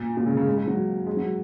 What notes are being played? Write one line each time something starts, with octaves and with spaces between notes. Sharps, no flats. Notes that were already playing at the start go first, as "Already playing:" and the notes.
Already playing: A#2
A#2
C#3
C#3
G#3
G#3
F#3
G#3
F#3